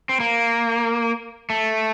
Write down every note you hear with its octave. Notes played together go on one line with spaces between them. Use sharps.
C4
A#3
A3